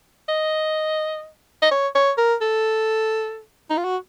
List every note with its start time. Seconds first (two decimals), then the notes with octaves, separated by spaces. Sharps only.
0.28 D#5
1.62 D#5
1.71 C#5
1.95 C#5
2.18 A#4
2.42 A4
3.70 D#4
3.77 F4
3.84 F#4